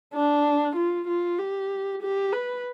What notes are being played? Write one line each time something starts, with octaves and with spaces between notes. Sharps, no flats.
D4
F4
F4
G4
G4
B4